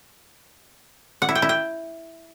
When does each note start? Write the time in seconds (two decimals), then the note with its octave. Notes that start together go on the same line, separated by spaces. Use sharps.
1.22 F#5
1.29 E4
1.35 G5
1.42 E4
1.49 G5